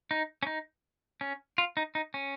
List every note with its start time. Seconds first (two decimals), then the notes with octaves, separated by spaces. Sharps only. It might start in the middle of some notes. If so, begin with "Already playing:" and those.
0.11 D#4
0.43 C#4
0.47 D#4
1.21 C#4
1.58 F4
1.77 D#4
1.95 D#4
2.14 C#4